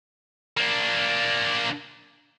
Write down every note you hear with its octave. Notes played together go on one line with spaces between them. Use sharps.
A#3 D4